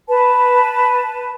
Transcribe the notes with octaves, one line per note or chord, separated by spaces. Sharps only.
B4 A5